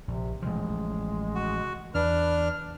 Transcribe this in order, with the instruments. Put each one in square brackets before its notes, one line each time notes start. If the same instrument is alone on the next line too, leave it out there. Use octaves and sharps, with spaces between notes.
[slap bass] A#1 [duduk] C3
[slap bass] A1 C3 F3 [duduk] G#3
[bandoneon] F#4
[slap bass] E2 [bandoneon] D4 F6 [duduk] B4